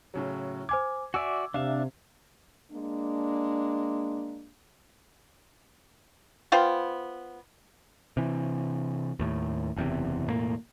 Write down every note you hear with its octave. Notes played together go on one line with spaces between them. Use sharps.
A2 C#3 F#3
C5 G#5 D6 G#6
F#4 D5 E5 G#5 D6 E6
C3 D4 E5 F5
G#3 A#3 D4
B3 F4 C5 G5
C3 E3
D#2 A2
F#1 E2 C3
E1 A2 A#3